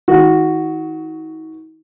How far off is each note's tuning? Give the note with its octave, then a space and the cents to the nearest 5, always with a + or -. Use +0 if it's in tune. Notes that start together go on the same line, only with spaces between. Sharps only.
D#3 +40 F#4 +0